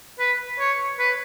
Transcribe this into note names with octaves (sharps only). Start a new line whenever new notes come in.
B4
C#5
B4